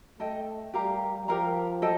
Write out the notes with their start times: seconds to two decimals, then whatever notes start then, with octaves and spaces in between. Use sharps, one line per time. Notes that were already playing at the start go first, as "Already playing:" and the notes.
0.20 A3 A4 D#5 G5
0.74 G3 G4 A#4 F5 A#5
1.27 F3 G4 A#4 F5 A#5
1.82 A4 D#5 G5